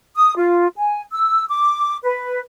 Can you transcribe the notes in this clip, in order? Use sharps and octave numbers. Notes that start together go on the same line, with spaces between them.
D#6
F4
G#5
E6
D6
B4